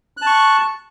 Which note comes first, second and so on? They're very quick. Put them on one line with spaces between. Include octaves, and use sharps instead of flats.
F#6 A5 C#6